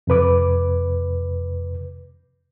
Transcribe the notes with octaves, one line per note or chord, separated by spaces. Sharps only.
F2 C3 B4 D6